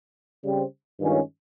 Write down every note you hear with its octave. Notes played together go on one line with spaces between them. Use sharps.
C#3 G3 C4
G2 D#3 G#3 C#4 F4